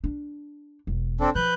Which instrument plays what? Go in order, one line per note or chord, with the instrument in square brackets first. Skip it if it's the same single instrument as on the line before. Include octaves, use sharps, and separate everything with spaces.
[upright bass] D4
E1
[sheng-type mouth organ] C4 D4 A4
[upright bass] F3 [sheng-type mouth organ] B4 F#6 G6